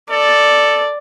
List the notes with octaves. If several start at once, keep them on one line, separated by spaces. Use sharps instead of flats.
A4 D5